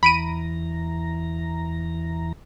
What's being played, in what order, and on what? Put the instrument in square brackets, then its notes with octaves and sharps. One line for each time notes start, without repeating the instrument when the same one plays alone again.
[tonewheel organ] E2 E3 A#5 [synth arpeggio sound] B5 D7 D#7